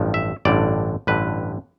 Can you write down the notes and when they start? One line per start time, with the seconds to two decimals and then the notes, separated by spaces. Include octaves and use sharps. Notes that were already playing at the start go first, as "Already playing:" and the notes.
Already playing: A1 G2 F3
0.14 E5
0.45 A1 G2 D3 D5
1.07 A1 G2 D3 B4